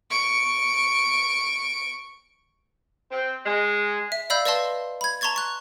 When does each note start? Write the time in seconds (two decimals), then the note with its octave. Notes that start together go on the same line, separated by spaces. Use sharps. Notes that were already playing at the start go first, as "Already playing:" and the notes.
0.10 C#6 D7
3.11 C4
3.46 G#3
4.12 E5
4.30 D5 D#5 F5 B5 E6 G6
4.45 B4 D5 D#5 F5 A5 C6
5.01 B5 G#6
5.21 A5 A#5 C6 C#6 G#6 A6
5.36 C#6 F#6